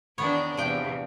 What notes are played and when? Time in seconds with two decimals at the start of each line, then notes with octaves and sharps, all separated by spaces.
0.18 E2 D#3 B3 D4 C#5
0.57 E2 C3 F3 G5